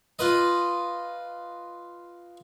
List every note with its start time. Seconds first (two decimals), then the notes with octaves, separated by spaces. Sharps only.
0.19 F4 B4 D#5